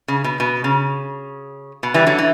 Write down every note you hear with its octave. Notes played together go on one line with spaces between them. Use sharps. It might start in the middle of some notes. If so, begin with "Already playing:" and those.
C#3
B2
B2
C#3
B2
E3 G3
D3 F#3
E3